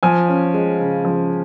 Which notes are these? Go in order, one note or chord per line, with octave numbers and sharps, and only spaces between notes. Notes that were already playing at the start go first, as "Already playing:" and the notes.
F3 G#5
C#4
G#3
C#3
F3